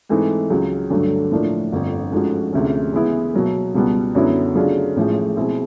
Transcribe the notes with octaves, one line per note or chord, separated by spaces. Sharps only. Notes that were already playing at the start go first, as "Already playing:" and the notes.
G#2 E3 A3 C4 D#4
C#2 C#3 F#3
G2 D3 F#3 A3
A2 F3 A#3 D4
G1 F2 D3
G#2 F3 A3 C#4 F#4
D2 C3 F3 G#3 C#4
C#3 E3 G#3 B3 E4
B2 F#3 A#3
C#2 B2 G3 B3
F#2 D3 F#3 B3 E4
C#3 F#3 A3 D4 F4
A1 A2 F3 G#3
B2 G#3 C4 E4